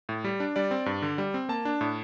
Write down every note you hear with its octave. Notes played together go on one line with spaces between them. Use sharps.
A2
G3
D4
G3 D5
C4
G2
D3
G3
C4
A#3 A5
D4
A2